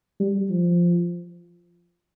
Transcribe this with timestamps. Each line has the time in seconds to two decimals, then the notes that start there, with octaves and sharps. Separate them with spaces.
0.20 G3
0.50 F3